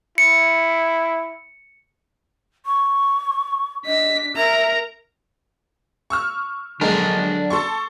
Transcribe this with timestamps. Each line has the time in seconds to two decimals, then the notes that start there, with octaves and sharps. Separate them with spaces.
0.18 E4 C#7
2.66 C#6
3.86 D4 D#5 B6
4.36 A#4 E5 A#5
6.10 C#6 E6 F6
6.81 D3 F#3 G#3 D4 A#4
7.50 A4 C6 C#6